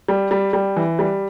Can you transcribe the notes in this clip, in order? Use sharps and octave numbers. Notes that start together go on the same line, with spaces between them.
G3
G3
G3
E3
G3